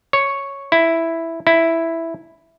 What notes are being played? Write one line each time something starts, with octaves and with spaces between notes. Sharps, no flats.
C#5
E4
E4